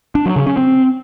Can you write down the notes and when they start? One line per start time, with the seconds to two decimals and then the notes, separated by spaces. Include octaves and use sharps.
0.15 D4
0.26 F#3
0.36 C#3
0.47 C#4
0.57 C4